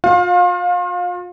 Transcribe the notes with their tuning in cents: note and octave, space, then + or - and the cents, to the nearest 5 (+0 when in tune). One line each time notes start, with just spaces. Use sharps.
F4 +40 F5 +25